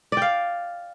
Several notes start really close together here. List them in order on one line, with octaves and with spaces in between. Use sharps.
D5 G5 F5